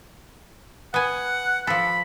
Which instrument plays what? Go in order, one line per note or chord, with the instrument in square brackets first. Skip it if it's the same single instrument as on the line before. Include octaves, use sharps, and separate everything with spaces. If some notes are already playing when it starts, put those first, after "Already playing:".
[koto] B3 G#5 [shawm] F#5
[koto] F3 A4 [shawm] B5